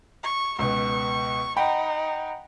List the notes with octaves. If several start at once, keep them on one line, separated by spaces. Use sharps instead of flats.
C#6
C#2 B2 C#6
D#4 F#5 G5 B5